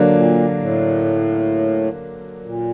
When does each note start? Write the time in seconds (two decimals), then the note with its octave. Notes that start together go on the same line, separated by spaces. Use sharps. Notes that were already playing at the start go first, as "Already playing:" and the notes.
Already playing: D3 F#3 A#3 D4
0.13 A#2
0.59 A2
2.45 A#2